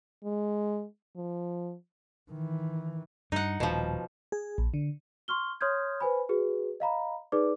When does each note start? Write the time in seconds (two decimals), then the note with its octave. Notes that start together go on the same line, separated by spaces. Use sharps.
0.25 G#3
1.16 F3
2.30 D#3 E3
3.32 G2 D#4 F#5
3.60 D#1 B2 F3
4.32 G#4
4.58 A#1
4.74 D3
5.28 C6 C#6 F6 G7
5.61 C#5 C6 D#6 F6 G6 G#6
6.00 B4 C5 G#5 B5
6.29 F#4 G#4 B4
6.80 D#5 F5 A#5 B5
7.32 D#4 G#4 B4 D5 D6